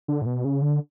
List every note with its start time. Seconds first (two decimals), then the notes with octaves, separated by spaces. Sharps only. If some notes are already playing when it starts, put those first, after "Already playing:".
0.08 D3
0.22 A2
0.26 B2
0.45 C#3
0.62 D3